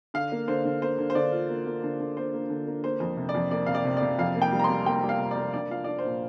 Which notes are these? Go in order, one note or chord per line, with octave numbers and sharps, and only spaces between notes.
D3 F5
A#3
D3 C5
D3
A#3 C5
D3
C5
D3 D5
F4
A#3
A#3
D3
D3
A#3 C5
A#3
D3
A#3
A#3 C5
F2
C3
D5
F2
A#3 D5
C3 F5
D5
C3
D5
C3
F2 F5
A#3
G5
G3
A#5
C6
G3
A#3 G5
G3
F5
C3
D5
A#3
D4 D5
F3 F5
D4 D5
C5
A#2